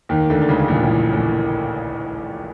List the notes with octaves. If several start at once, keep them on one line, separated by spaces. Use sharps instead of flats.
D#2 D#3
D2 D3
D3
C#2 C#3
A#1 A#2
A1 A2
A1 A2